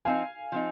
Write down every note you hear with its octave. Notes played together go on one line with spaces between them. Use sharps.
F3 C4 D#4 F5 G#5
F3 C4 D#4